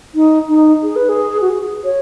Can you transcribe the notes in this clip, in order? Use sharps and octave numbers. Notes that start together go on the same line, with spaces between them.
D#4
D#4
G#4
B4
G#4
F#4
G#4
C#5